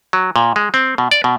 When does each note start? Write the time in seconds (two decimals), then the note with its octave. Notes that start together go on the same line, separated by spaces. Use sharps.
0.13 F#3
0.36 A#2
0.56 G#3
0.74 C4
0.98 B2
1.11 D5
1.24 B2